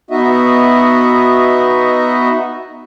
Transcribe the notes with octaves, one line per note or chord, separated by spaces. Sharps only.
B3 D#4 F#4 D#5 E5